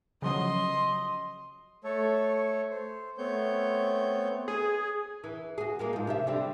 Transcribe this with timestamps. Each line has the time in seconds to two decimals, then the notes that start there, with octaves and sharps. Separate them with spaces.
0.22 C#3 F3 F#3 D#5 C6
1.84 A3 A4 C#5
2.70 C5
3.18 A3 B3 C4 C#5 G6
4.48 G#4
5.24 E3
5.58 F#4 G#4
5.79 G#3 A#3 A#4
5.93 G#2 F3
6.07 C3 G4 E5
6.27 D3 G3 C4